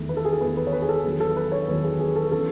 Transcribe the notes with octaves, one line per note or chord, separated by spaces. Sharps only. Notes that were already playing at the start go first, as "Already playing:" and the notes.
Already playing: E2 D#3 A3
B4
A4
G#4
A4
E2 D#3 A3 B4
B4
C#5
B4
G#4
A4
E2 D#3 F#3 G#4
A4
B4
C#5
E2 D#3 F#3 B4
G#4
G#4
A4
C#3 E3 B3 A4